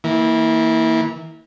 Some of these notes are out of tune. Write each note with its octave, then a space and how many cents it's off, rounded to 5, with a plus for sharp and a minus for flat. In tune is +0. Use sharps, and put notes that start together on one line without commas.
E3 -25 A#3 +0